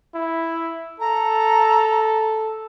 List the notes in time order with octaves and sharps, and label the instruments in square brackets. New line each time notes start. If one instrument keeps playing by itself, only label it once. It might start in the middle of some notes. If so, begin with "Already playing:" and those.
[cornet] E4
[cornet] A4 [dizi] A#5